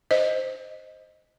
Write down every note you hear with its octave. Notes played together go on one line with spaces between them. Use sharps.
C5 D#5